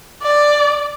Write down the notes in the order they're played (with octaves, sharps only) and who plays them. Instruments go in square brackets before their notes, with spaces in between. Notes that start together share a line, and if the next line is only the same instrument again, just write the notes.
[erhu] D5